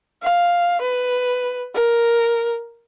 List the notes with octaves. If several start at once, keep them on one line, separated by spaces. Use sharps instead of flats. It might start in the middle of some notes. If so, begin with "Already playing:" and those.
F5
B4
A#4